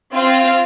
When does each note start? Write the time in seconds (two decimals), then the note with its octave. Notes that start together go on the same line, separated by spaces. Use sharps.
0.13 C4 F4